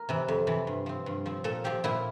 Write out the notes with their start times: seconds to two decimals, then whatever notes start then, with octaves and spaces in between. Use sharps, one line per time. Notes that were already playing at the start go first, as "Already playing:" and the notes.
Already playing: A#4
0.09 C3 E3
0.28 F2
0.47 C3 E3
0.67 G2
0.86 F3 C4
1.06 G2
1.26 F3 C4
1.44 A#2 A4
1.64 F3 C4 G4
1.84 A#2 E4